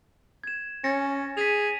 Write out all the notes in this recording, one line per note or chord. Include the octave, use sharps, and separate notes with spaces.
G#6 E7
C#4 A6 A#6 C#7
G#4 B6 D#7 F7